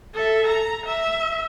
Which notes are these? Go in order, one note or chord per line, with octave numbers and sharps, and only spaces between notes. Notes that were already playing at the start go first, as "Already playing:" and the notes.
A4 E5
A#5
E5